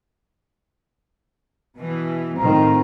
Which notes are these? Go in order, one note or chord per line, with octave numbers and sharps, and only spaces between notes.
B2 E3
A2 D#3 C4 F4 A#5